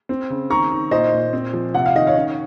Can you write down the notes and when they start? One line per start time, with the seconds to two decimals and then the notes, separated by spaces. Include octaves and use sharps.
0.09 C4
0.30 C#3
0.50 D#3 A#5 C#6
0.71 D#3
0.91 A#2 C5 D#5
1.12 A#2
1.33 C4
1.53 F3
1.74 C3 F#5
1.86 F5
1.95 D#3 D#5
2.07 C#5 F5
2.15 C#4